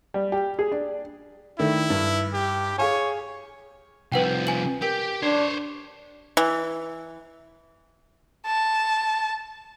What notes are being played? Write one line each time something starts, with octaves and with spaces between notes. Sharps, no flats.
G3
G4
G#4
D4
D#3 A3 D4 E4
G2
G4
G#4 C#5 F5 G#5
C2 F3 B4 F#5 G5
G#5 F#7
G4 A#4
D4 C5 C#5
E3
A5